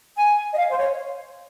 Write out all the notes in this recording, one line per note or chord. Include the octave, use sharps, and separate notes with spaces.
G#5
D#5
F5
C5
C#5